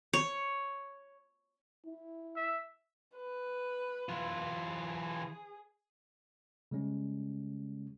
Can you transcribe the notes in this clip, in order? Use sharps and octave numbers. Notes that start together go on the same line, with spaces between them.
C#5
E4
E5
B4
E3 F4
G#4
C#3 G3 G#3 C#4